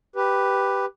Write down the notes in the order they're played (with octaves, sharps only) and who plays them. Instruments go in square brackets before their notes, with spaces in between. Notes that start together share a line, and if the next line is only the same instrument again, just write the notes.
[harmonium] G4 B4